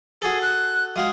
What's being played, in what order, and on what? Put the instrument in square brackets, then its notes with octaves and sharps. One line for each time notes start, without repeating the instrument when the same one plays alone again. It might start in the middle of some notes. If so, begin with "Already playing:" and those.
[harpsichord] F#4 A4 [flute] G#4
[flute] F#6
[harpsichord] G#3 F#4 G#4 [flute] F5